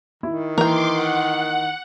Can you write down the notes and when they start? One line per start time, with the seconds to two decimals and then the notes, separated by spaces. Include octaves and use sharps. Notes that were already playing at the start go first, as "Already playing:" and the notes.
0.23 D#3 E4
0.58 E3 A#3 A#4 G5 C6 D6
0.92 F#5